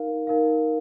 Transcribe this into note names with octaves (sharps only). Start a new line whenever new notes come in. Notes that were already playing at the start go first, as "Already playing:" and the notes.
Already playing: D#4 A#4 F5
D#4 A#4 F5